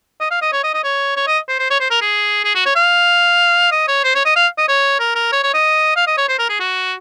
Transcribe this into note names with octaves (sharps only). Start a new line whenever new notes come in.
D#5
F5
D#5
C#5
D#5
D#5
C#5
C#5
D#5
C5
C5
C#5
C5
A#4
G#4
G#4
F#4
C#5
F5
D#5
C#5
C5
C#5
D#5
F5
D#5
C#5
A#4
A#4
C#5
C#5
D#5
F5
D#5
C#5
C5
A#4
G#4
F#4